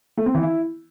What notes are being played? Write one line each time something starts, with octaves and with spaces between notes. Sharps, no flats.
A3
C4
E3
E4